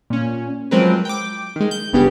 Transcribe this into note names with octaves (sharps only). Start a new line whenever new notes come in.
A#2 C#4
F3 F#3 G#3 C4 A#4 B4
G5 D6
D#3 G#3
G6
G1 G2 C#3 B3 G4